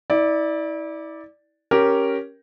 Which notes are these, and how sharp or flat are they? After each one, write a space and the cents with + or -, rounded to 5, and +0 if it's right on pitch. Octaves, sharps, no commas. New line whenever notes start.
E4 -35 D5 +0
C#4 +0 G4 -5 A#4 +0